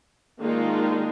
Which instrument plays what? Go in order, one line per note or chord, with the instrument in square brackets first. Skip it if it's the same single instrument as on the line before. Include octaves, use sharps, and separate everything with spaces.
[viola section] D#3 G#3 A#3 D4 D#4 F4